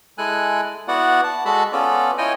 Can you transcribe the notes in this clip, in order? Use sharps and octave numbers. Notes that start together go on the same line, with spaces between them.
G#3 E4 A4 G#5 F#6
B3 E4 F#4 D5 F#5
A5
G#3 F#4 A4 A5 B5
B3 C#4 F4 A4 D5
E4 F4 C#5 D#5 G5 G#5